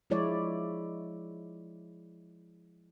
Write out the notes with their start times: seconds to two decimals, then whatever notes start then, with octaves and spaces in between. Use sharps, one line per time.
0.10 F3 G#3 E4 C#5 D5